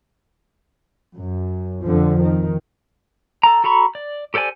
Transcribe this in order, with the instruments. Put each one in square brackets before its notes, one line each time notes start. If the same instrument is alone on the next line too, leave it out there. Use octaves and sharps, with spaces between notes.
[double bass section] F#2
F2 D3 F3
D#3
[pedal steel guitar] A4 A#5
F#4 A4 A#5 B5 C#6
D5
G4 A4 C5 D5 G#5